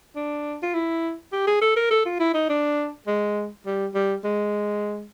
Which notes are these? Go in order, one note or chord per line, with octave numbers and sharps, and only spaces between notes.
D4
F4
E4
G4
G#4
A4
A#4
A4
F4
E4
D#4
D4
G#3
G3
G3
G#3